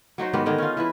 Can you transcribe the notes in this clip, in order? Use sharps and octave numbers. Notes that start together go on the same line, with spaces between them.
F#3 D#4 F#4 C5
G#2 D#3 B3 G4
D3 D#3 D#4 G#4
C#4 F4
E3 E4 B4